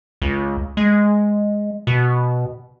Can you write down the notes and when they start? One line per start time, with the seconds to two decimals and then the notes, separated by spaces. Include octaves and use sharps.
0.22 C#2
0.77 G#3
1.87 B2